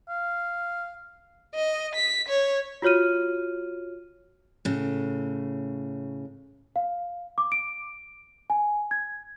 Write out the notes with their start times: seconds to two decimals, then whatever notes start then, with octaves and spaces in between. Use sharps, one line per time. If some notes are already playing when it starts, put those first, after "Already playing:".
0.09 F5
1.55 D#5
1.95 B6
2.29 C#5
2.82 F4 F#4 C#5 F6 D#7
4.65 A2 C#3
6.76 F5
7.38 D6
7.52 D7
8.50 G#5
8.91 G#6